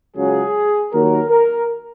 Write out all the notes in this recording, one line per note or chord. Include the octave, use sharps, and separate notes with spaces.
C#2 C#3 F#3 G#4
D#2 D#3 F#3 A#4
A#4